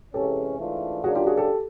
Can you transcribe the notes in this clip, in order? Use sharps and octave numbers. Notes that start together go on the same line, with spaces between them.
C3 E3 G#3 C#4 G4 A4
G#2 E3 A3 D4 F4
C#3 F#3 A#3 D4 F#4 G#4
F4 G4
F#4 G#4
G4 A4